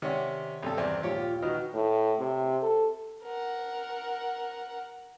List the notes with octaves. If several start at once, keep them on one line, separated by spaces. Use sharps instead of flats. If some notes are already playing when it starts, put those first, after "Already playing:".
C3 D#3 C#4 D5 F#5
B1 G2 C3 A4
E2 C4 D5
A#1 D#2 F4 G4 C#5
D#3 F#4 B4 D#5 F6
A2
C3
A4
A#4 F#5